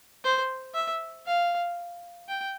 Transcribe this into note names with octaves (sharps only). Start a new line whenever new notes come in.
C5
E5
F5
G5